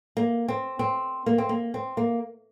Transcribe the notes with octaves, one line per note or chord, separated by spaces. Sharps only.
A#3
C4
C4
A#3
C4
A#3
C4
A#3